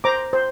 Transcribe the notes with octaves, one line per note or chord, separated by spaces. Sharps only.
C5 A#5 D6
C5